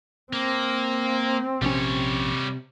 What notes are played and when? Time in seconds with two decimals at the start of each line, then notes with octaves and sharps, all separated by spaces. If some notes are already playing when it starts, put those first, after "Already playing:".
0.33 A#3 C4
1.62 A#1 C3 G3 C#4 C#5